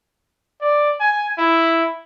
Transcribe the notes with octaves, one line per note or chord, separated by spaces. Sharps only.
D5
G#5
E4